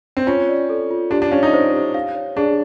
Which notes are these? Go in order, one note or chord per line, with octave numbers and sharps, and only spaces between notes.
C4
C#4 F4
D5
A4
F4
D4 G4
D4
C#4 F5
D#4
C5
G4
F5
C#5
D4 G#4